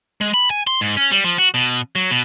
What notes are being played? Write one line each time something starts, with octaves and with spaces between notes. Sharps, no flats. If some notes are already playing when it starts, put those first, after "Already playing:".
G#3
B5
G#5
C6
G#2
C#4
G3
F3
F#4
B2
F#3
B2